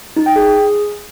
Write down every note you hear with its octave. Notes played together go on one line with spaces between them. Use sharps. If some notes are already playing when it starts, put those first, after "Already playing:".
D#4
G5
G#4